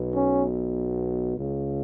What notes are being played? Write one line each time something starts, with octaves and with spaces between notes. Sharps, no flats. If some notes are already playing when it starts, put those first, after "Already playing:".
Already playing: B1 B2
C#4
C#2 C#3